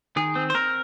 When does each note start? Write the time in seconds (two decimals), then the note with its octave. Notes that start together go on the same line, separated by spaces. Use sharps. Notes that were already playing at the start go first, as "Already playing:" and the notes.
0.16 D#3 G#4
0.35 C4
0.50 C5
0.54 C4 A#4